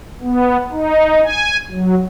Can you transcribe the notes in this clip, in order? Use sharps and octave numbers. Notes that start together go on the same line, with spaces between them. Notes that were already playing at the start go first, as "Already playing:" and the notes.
B3
D#4
G#5
F#3